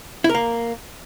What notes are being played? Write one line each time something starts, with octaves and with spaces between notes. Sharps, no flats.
E4
A#4
A#3